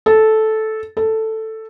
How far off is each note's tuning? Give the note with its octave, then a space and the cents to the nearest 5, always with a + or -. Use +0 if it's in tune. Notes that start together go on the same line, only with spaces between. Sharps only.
A4 -10
A4 +5